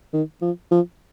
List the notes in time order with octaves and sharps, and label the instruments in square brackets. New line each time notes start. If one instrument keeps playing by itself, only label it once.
[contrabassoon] D#3
F3
F3